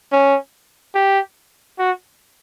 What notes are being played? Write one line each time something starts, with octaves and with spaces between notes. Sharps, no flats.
C#4
G4
F#4